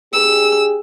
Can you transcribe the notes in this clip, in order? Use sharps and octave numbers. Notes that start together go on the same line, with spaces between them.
D4 G4 G#4 E6